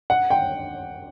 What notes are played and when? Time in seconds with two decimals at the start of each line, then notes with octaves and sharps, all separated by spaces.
0.10 F#5
0.30 G5